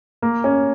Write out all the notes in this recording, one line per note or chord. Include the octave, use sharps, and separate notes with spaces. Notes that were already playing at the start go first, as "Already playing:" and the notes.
A#3
C#4